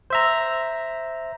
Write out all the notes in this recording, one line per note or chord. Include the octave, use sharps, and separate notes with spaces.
C5 E5 A#5